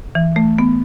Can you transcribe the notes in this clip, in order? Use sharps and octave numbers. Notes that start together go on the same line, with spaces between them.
E3
A3
B3